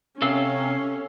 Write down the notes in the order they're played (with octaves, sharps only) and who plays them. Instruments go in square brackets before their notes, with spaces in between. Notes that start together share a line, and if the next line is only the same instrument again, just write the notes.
[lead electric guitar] C3 [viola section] C#4 [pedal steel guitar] A4 F5 E6